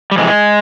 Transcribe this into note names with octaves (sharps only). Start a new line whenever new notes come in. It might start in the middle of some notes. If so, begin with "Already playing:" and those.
G3
F2 C3 E3 G#3